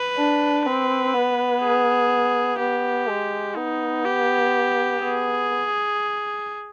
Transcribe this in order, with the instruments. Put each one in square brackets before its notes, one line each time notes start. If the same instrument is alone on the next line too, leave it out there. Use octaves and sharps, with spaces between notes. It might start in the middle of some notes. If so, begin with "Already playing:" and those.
Already playing: [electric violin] B4
[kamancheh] D4
[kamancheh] C4 [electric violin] B4
[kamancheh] B3
[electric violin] G#4
[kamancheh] B3 [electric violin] G4
[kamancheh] G#3
[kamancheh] B3 [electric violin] D#4
[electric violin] G4
[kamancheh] B3 [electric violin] G#4